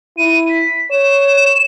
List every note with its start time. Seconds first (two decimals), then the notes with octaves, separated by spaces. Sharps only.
0.18 E4 D#7
0.49 B6
0.91 C#5 E7